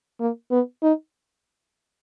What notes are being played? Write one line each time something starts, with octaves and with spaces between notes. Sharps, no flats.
A#3
B3
D#4